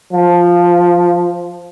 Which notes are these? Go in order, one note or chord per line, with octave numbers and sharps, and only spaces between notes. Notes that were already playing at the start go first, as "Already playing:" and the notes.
F3